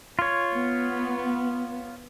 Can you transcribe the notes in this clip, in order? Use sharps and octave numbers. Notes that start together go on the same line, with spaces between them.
F4 C#5
B3